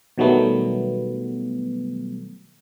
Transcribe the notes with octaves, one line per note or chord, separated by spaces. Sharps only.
B2 D#3 F#3 G3 A3 B3